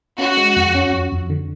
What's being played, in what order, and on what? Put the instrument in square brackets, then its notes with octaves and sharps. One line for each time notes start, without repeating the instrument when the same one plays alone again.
[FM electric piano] C#4 [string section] F#4
[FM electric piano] G#3
F2
C#4
F2
F2
D3